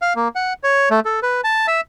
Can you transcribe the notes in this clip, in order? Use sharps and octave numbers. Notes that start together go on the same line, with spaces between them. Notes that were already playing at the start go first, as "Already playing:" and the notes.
F5
A#3
F#5
C#5
A3
A4
B4
A5
E5